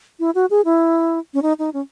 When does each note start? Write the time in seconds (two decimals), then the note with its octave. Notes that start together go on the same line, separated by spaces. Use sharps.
0.19 E4
0.35 F#4
0.50 G#4
0.65 E4
1.34 C#4
1.42 D#4
1.59 D#4
1.74 C#4